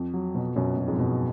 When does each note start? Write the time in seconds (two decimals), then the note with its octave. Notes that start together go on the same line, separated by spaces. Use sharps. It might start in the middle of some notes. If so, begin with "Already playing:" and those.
Already playing: F2
0.14 F#3
0.35 B2
0.56 F#2 B2
0.77 B2
0.88 F2 G#2
0.98 B2